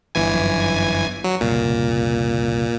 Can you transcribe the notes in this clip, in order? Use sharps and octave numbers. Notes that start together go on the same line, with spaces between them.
G1 E3 G#5
F#2 F3
F#3
C2 F2 A#2 C#3